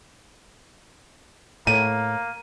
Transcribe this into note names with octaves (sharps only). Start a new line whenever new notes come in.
A2 A#3 D#7